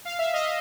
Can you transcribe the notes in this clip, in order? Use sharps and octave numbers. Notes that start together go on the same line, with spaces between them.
F5
E5
D#5